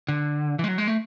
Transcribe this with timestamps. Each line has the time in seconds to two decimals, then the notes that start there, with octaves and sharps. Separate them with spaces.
0.08 D3
0.59 E3
0.64 G#3
0.68 F#3
0.78 G#3
0.88 A3